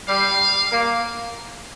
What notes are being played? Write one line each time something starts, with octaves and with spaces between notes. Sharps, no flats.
G3 F5
A#3